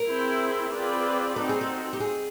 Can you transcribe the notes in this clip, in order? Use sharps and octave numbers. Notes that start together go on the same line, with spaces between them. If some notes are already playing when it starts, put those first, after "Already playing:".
Already playing: A#4
C4 E4 G#4 C5
C4 F4 G#4 B4 D5
C4 D#4 F#4 A4
G#4
A4
G4
G#4